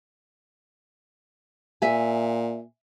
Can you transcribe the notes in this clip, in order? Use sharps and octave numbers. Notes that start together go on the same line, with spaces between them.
A#2 E5 G#5